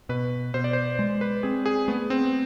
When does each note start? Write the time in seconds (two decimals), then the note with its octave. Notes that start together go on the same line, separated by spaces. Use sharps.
0.09 B2 B4
0.54 B2 C5
0.64 D5
0.73 C5
0.99 G#3
1.21 B4
1.43 C4 G#4
1.66 G#4
1.88 A3 B3
2.10 C4